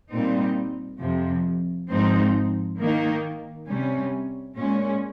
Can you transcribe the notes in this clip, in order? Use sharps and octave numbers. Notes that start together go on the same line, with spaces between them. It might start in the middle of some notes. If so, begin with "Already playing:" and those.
A#2 G3 C4 D#4
F2 C3 F3
G#2 F3 C4 D#4
D#3 A#3 D#4
C3 G3 C#4
A#2 G#3 C#4